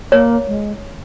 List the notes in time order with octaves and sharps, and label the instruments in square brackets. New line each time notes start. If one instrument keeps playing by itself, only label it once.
[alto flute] A#3 [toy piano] C#5
[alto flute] G#3